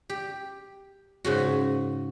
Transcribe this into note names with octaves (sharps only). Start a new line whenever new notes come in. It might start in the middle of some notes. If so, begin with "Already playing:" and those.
G4
G#2 C#3 F#4